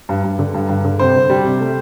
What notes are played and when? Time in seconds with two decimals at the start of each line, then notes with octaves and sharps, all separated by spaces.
0.09 G2
0.24 G2
0.39 D3
0.54 G2
0.69 G2
0.85 D3
0.99 C3 C5
1.15 G3
1.30 G3
1.45 C3
1.61 A3